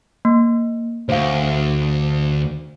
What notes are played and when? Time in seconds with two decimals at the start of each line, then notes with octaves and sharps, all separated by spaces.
0.25 A#3
1.09 D2 C5 F5